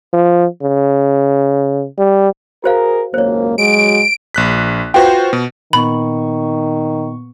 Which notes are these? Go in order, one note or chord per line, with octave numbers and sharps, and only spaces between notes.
F3
C#3
G3
F#4 G#4 A#4 C5 F5
G#1 C#2 F#2 A#3 C5 C#5
F#3 G#3 F#4 D7
A#1 F#6 B6
F4 F#4 B4 C5 G5
B2
A#2 D#3 B3 B5 C#6